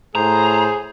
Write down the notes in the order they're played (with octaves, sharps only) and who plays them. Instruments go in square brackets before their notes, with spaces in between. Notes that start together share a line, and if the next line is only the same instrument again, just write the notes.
[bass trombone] A2 [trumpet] G#4 [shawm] C5 [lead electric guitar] A#5